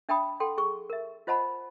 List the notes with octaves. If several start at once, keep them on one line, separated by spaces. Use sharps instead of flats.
D4 E5 G5 A5 B5 D#6
A4 F#5 G5 C6
G#4 C#6
A#4 E5
F4 C5 D#5 F#5 A5 B5